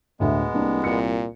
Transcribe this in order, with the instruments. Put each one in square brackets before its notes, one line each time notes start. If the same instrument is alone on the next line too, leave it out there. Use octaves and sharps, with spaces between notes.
[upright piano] D2 A2 [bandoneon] G#3 B3
[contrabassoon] C2 [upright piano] A#3 D4
[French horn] A#2 [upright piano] C#7